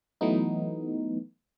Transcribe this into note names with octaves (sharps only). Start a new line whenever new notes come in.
E3 F#3 A3 B3 D#4